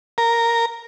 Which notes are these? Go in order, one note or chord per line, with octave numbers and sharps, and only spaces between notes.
A#4